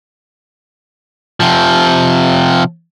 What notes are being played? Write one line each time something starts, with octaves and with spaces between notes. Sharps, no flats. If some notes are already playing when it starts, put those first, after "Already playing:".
C3 F3